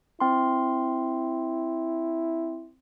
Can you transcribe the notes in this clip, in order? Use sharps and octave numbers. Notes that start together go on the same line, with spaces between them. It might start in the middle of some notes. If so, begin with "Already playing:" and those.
C4 E4 C6